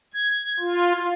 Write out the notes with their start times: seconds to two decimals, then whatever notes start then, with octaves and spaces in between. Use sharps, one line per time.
0.14 G#6
0.60 F4